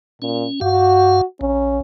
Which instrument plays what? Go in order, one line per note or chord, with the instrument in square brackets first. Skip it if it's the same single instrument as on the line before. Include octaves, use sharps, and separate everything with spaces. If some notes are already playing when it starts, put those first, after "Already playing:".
[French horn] A#2 [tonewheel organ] C#4
[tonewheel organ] G2 F5 [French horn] F#4
[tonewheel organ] A#1 [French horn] C#4